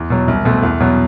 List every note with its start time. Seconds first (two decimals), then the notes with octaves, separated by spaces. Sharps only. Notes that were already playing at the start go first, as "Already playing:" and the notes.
Already playing: E2
0.10 B2 F#3
0.28 C2
0.45 B2 A3 C4
0.63 E2
0.80 B2 F#3